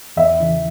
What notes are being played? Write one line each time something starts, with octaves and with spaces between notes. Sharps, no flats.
E2 E5
C#3 E3